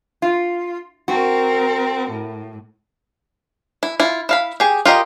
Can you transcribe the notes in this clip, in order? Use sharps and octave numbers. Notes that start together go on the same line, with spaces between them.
F4
C4 F#4 A#4
A2
E4
E4 F4
E4 F5 B5
G4 G#4
F4 G4 A#4 D#5